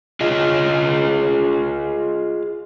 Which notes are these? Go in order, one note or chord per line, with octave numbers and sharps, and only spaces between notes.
F4 G#4 D#5